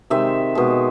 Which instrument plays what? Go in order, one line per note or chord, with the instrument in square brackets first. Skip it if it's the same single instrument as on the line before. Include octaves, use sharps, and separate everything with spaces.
[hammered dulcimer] C3 D#3 G#3 E5
B2 G#3